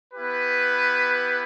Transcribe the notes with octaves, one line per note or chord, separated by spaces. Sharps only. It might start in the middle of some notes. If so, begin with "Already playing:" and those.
B3 E4 G4 B4